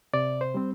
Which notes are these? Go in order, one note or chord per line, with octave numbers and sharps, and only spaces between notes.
C3 D5
C5
G3 C4